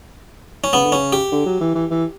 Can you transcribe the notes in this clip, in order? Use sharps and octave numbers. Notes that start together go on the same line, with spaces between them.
C#4
C#3 B3
D3
C#3 C#4
G4
D3
F#3
E3
E3
E3